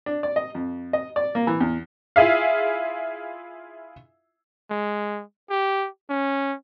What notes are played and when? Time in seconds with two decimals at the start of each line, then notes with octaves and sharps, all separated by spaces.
0.06 D4
0.23 D5
0.36 D#5
0.55 F2
0.93 D#5
1.16 D5
1.35 A#3
1.47 E3
1.60 E2
2.16 E4 F4 G#4 E5 F5
4.70 G#3
5.50 G4
6.10 C#4